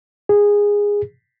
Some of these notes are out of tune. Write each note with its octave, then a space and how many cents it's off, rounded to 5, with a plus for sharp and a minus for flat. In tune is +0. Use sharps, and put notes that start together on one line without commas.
G#4 -15